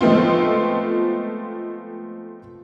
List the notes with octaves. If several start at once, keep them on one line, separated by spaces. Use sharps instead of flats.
F3 G#3 A3 B3 C4 F4